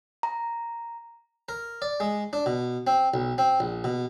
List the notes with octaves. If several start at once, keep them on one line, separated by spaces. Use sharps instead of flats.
A#5
A#4
D5
G#3
D4
B2
C4
B1
C4
A#1
B2